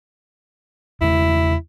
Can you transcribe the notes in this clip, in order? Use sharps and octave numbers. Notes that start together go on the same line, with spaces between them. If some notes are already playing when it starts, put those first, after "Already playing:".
E2 C#3 G#3 E4